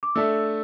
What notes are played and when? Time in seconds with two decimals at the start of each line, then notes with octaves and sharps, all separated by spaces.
0.03 D6
0.15 A3 D4 A4 E5 E6